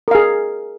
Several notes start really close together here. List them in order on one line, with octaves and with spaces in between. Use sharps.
A#4 F5 G#4